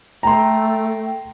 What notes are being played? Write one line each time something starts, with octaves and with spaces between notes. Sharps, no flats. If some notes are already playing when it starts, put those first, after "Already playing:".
A3 G5 A#5 C6